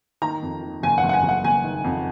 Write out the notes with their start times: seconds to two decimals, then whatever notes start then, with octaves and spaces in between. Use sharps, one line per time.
0.22 D#3 A#5
0.42 F2
0.63 D#3
0.83 F#1 G#5
0.98 F#5
1.04 F#1
1.09 F#5
1.13 G#5
1.23 F#1
1.29 F#5
1.44 F#1 G#5
1.64 D#3
1.84 F2